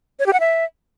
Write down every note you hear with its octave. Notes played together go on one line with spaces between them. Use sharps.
C#5
G4
F#5
E5